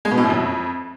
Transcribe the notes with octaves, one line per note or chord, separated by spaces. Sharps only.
G#3
B2
A2
F#2
F2